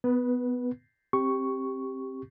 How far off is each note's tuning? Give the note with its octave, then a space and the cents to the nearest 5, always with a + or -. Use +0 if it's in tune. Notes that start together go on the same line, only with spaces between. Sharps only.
B3 +15 B4 -15
C4 +20 G4 +0 C#6 +0